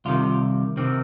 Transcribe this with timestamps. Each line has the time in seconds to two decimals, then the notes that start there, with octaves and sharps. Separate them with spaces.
0.05 C2 C3 D#3 F4
0.77 C3 D#3 C4